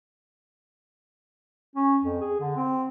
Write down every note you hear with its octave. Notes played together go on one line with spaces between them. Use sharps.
C#4
F2
G#4
D3
C4